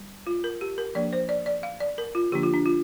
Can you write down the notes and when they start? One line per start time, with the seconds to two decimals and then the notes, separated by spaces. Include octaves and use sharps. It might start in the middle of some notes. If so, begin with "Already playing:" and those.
Already playing: G3
0.27 F4
0.44 A#4
0.61 G4
0.78 A#4
0.95 F3 A#3 D4 D5
1.13 C5
1.29 D5
1.46 D5
1.63 F5
1.80 D5
1.98 A#4
2.15 F4
2.32 D3 F3 A#3 D4 G4
2.43 F4
2.54 D4
2.66 F4